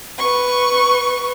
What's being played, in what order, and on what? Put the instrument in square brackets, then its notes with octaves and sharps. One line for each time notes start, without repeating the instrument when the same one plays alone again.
[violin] B4 C#6